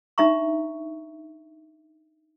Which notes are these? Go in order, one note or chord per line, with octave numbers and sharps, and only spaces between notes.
D4 D#4 E5 A#5 C#6